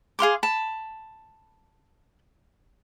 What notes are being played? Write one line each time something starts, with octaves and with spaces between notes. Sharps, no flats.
G#4 F5 C6 D6
A5 B5